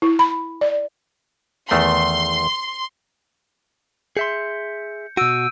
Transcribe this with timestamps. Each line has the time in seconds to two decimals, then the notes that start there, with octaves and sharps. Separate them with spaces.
0.02 E4
0.19 B5
0.61 D5
1.71 E2 D#3 A3 C6
4.17 G#4 E5 C6 G6 C#7
5.17 B2 F#4 E6 G6 D7 D#7